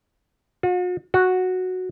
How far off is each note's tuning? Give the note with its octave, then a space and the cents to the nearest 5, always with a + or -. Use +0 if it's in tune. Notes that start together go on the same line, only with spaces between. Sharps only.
F#4 -45
F#4 -5